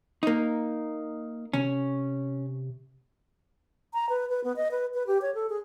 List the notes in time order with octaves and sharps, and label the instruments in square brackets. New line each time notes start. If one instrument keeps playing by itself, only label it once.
[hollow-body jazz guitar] A#3 D#4
[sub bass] C3 [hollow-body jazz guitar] C#4
[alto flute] A#5
B4
B4
B3
D#5
B4
B4
G4
C#5
A4
G#4